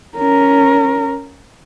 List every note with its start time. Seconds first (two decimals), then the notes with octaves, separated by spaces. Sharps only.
0.17 C#4 A#4